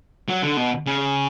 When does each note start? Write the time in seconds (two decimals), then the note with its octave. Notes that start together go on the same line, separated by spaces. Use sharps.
0.28 F#3
0.43 D3
0.57 B2
0.86 C#3